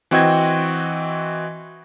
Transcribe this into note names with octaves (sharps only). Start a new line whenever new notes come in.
E3 C4 F#4 D#5 G5 G#6